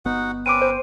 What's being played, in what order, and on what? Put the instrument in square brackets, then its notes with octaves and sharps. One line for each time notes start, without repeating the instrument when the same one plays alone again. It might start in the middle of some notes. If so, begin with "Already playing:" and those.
[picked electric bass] G1 B3 [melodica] D#4 F#4 F#5
[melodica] C4 C#4 B4 [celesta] D6 D7 D#7
[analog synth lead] C5